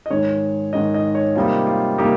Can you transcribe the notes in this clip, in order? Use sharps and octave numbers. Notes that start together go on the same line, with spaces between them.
D#5
G#2 D#3 G#3 D#4 C#5
G#2 D#3 G#3 D#4 D#5
D#5
C#5
C3 G3 A#3 D#4 F4
F4
C3 G3 A#3 D#4 G4